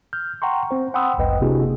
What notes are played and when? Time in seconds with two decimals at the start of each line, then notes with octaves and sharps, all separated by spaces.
0.13 F6 G6
0.42 F#5 G5 A#5 C6 C#6
0.71 C4 C5
0.94 F#5 G5 B5 C6 D#6 E6
1.18 G1 C#2 F#2 B4 D#5 G5
1.41 C3 A#3 D4 E4 F#4 G#4